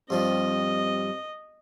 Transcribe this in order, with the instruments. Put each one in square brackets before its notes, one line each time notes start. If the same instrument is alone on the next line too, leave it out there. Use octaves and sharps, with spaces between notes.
[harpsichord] G2 F3 G3 [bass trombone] C4 [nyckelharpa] D#5